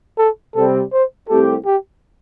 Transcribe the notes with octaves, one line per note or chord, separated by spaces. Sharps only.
A4
C3 G3 C4 A4
C5
C2 C3 A3 C4 G4 A4
G4